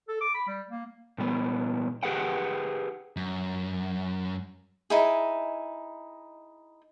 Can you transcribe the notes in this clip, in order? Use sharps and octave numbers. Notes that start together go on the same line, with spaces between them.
A4
D6
B5
G3
A#3
A#2 G3 B3
G4 G#4 B4 F#5 G5
F#2
D#4 E4 G#4